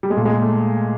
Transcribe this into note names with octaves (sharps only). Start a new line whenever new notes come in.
G3
G#3
A#2 A3
G#3
A3